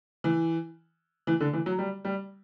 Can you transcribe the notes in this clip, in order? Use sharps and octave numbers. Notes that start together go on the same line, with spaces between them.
E3
E3
D3
E3
F#3
G3
G3